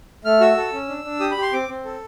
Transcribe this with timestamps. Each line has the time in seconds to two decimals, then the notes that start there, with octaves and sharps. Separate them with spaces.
0.25 A3 F6
0.41 F#4 E6
0.57 A4
0.73 C#4
0.89 D4
1.05 D4
1.20 G4 D#6
1.31 B5
1.37 G4
1.42 C6
1.53 C4 D6
1.69 C4
1.85 A4